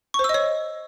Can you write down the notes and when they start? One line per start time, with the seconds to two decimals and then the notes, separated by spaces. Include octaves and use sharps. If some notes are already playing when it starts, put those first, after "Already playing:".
0.14 C#6
0.19 C5
0.24 E6
0.29 D#5
0.34 C#5